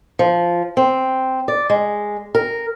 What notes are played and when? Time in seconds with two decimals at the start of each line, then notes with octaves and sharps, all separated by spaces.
0.19 F3
0.77 C4
1.48 D5
1.70 G#3
2.35 A#4